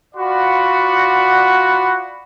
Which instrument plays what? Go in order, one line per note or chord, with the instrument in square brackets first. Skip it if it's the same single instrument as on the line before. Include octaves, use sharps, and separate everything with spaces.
[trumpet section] F4 F#4 D5 F#5 B5